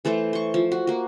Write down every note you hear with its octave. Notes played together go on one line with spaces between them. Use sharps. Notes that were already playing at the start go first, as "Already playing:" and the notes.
E3 A3 A4 C5
C5 C#6
F3
F#4
A#3 F#4